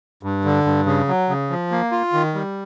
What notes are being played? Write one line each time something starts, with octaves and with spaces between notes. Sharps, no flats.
G2
D3
G2
C#3
F#3
C#3
F3
A#3
F4
D#3
G3